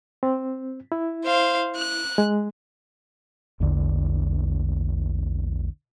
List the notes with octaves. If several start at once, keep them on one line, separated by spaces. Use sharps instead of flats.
C4
E4
C5 F5
F#6
G#3
A#1 E2 D3